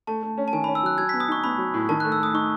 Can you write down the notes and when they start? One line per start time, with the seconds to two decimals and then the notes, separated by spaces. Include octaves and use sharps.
0.07 A3 A5
0.23 A3
0.38 C#4
0.48 A5
0.53 D#3 G#5
0.64 B5
0.68 C#4
0.75 E6
0.83 F#3 F#6
0.98 F#3 G#6
1.09 B6
1.13 B3
1.20 D#6
1.28 D#4 C#6
1.44 B3 B5
1.58 F#3
1.74 A2
1.89 D#3 A5
2.00 F#6
2.04 A3
2.12 E6
2.19 A3 D#6
2.34 D#4 C#6